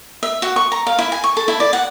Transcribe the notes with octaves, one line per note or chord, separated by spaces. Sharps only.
E5
F#4
C#6
A#5
F5
E4
G#5
C#6
A4
E4
D5
F#5